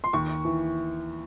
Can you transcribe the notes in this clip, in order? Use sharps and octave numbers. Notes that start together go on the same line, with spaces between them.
C6
D#2 C#6
E3